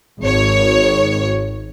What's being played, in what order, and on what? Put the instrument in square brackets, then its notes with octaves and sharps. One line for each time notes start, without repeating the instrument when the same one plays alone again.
[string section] G#1 C#5